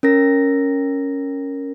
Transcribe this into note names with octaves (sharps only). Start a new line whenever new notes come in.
C#4 A#4 A#6